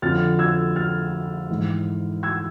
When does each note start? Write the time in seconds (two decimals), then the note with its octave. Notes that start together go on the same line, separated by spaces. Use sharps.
0.02 F2 D3 F3 F6 A6
0.39 E6 G#6
0.76 F6 A6
1.49 G#2 E3
2.23 E6 G#6